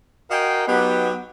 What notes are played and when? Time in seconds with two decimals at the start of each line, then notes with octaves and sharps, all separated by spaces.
0.30 F#4 A#4 D#5 F5 G5 G#5
0.67 F#3 B3 D#4 G4